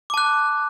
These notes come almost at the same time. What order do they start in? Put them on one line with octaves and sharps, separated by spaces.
D6 A5 F#6